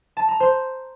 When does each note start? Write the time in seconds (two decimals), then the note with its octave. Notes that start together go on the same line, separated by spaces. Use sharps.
0.17 A5
0.28 A#5
0.40 C5